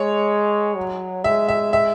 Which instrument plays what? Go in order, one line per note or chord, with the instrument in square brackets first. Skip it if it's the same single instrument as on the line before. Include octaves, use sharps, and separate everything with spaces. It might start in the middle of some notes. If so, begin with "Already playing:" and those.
Already playing: [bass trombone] G#3 [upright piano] C#5
[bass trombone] F#3
[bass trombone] G#3 [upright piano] E5
[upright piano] E5
E5